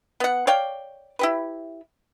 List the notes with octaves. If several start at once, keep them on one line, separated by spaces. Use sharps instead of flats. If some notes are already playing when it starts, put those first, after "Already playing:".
B3 F#5
C#5 D5 F5 G5
E4 G4 B4